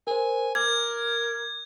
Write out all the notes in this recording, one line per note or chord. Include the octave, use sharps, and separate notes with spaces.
A#4 C5 G#5
A#4 D6 G#6